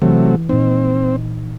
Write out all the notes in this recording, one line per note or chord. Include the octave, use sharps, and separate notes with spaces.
C3 E3 F#3 A3
A#2 C4 D#4